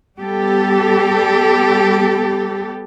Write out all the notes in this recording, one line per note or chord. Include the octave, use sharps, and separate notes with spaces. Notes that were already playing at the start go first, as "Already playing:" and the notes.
G3 B3 G4 A4